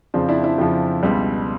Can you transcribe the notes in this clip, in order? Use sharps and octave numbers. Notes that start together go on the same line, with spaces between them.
F2 C#3 F3 C4 D4
D4 E4
D4 E4
F2 C#3 F3
C#2 B2 G3